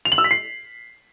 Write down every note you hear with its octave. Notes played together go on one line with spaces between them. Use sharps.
F7
F#7
E6
B6
C7